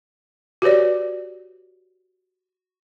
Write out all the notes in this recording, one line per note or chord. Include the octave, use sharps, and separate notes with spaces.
F#4 G4 B4 C#5 D5